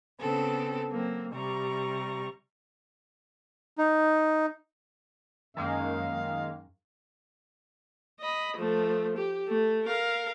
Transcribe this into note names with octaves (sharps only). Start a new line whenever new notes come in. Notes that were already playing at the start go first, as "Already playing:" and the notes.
C#3 B3 C4 A4
F#3 A#3 C4
C3 G3 A#5 C#6
D#4
F#2 D#3 G#3 A#3 F5
D#5 B5
F3 A3
G4
A3
A#4 F5